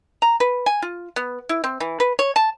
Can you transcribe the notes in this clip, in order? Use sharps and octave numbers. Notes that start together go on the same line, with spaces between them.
A#5
B4
G#5
F4
B3
E4
C4
E3
B4
C#5
A5